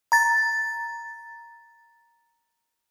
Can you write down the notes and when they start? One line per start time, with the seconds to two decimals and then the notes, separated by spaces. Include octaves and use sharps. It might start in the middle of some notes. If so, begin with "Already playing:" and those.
0.12 A#5 A6